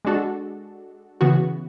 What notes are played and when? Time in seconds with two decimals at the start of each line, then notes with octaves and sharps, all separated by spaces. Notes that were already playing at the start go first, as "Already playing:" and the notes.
0.05 G#3 D4 F#4 A4
1.21 C#3 E3 B3 F#4